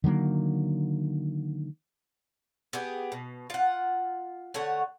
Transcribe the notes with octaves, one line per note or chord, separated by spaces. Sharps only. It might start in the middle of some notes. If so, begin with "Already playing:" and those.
D3 D#3 F#3 A#3
B3 G4 G#4
B2
F4 F#5
D3 A3 C#5 F#5